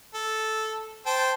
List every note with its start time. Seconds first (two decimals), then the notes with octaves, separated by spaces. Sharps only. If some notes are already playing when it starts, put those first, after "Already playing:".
0.14 A4
1.06 C5 G5 A5